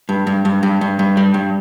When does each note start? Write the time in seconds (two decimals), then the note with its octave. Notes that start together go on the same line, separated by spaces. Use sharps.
0.09 G2
0.27 G2
0.45 G2
0.63 G2
0.81 G2
0.99 G2
1.17 G3
1.34 G2